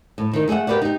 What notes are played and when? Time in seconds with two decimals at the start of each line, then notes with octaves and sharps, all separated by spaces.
0.18 A2
0.33 D#3 D#4
0.48 A3 G#4 C5 E5 F#5
0.67 G4 A#4 B4 D5 F#5
0.82 D#4 G4